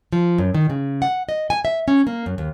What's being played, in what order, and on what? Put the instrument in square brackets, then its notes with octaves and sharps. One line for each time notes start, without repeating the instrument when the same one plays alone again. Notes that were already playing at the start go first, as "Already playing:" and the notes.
[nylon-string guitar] F3
F#2
D#3
C#3
F#5
D#5
G#5
E5
C#4
A#3
F#2
D#2